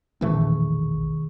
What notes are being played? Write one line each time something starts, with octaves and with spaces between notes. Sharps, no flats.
E1 A#1 D#3 E3 A3 G#4 C#6